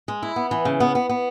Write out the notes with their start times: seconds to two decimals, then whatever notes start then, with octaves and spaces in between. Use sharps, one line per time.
0.08 G#3
0.22 E4
0.36 B3
0.51 E3
0.65 C#3
0.80 B3
0.95 B3
1.09 B3